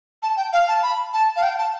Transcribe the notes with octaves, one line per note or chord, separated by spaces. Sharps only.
A5
G5
F5
A5
B5
A5
F5
G5
A5